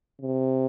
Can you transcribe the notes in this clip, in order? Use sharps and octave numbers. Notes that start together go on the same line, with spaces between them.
C3